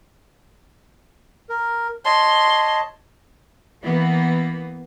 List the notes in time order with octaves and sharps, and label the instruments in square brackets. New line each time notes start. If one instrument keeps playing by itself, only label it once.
[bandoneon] A#4
[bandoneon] C#5 D#5 A5 [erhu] C6
[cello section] E3 A#3 B3